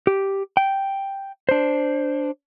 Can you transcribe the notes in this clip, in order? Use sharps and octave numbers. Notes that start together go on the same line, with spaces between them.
G4
G5
D4 C5